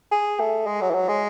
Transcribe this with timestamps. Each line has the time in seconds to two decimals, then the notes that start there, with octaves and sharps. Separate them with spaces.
0.12 G#4
0.40 A3
0.66 G#3
0.81 F#3
0.90 E3
0.94 F#3
1.09 G#3